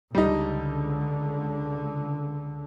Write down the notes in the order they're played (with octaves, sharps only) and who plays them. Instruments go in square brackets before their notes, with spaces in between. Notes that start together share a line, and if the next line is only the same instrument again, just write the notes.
[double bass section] C#2 D3 [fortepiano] G3 D#4